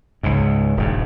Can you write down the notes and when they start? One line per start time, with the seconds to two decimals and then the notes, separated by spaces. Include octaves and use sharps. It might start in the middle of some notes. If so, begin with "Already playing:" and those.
0.23 C#2 G#2
0.77 D#1 G2